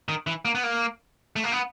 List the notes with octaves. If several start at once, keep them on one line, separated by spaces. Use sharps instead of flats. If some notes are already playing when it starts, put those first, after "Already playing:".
D#3
E3
A#3
B3
A#3
A3
A#3
B3